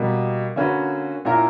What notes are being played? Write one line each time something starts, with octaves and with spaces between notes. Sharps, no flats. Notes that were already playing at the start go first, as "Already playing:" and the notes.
Already playing: B2 G3 A#3
D3 A#3 C#4 F#4 B4
A#2 A#3 C#4 E4 A#4